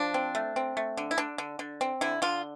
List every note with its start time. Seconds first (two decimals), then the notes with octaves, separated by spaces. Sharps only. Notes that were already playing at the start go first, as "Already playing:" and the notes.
Already playing: F3 D4
0.14 C4
0.35 A3
0.56 C4
0.77 A3
0.97 D3
1.11 E4
1.18 D3 D4
1.38 D3
1.59 D3
1.81 C4
2.01 D3 E4
2.22 D3 F4